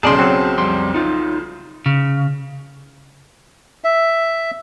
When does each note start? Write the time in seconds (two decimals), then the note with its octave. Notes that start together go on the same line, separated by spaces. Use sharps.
0.03 B1 C#3 G#4 D5 A5 C6
0.19 F#3 C4
0.58 F2 G3 C6
0.94 D#4 F4
1.86 C#3
3.84 E5